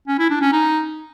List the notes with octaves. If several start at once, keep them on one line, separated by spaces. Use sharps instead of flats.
C#4
E4
D4
C#4
D#4